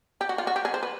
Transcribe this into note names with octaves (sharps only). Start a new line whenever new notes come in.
G4
F#4
F4
F#4
G4
G#4
C5
B4